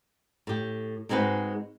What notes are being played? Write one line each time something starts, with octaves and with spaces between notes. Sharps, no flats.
A2 G4
G#2 G#3 C4 F#4 B4